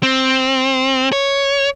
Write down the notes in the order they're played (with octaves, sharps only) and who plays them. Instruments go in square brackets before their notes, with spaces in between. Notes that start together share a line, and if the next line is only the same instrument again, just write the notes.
[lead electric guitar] C4
C#5